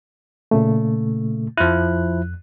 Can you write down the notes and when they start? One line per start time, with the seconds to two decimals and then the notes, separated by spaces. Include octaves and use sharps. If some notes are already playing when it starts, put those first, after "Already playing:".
0.51 A#2 C#3 A3
1.57 F2 F3 E4 F#6